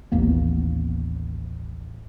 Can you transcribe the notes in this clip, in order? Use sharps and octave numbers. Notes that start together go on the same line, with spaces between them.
A1 D#2 A#3 B3